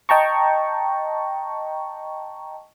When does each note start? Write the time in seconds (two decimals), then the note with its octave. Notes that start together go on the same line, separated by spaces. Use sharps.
0.09 D#5 G5 A5 A#5 C#6